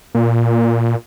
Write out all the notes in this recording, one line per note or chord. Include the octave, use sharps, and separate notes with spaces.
A#2